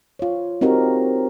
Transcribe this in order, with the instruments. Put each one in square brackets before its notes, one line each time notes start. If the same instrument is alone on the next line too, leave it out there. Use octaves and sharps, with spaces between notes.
[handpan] F4 C#5
C4 D#4 F#4 G4 A#4